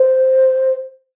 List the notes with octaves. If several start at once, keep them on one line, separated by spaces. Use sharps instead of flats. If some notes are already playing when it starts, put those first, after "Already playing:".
Already playing: C5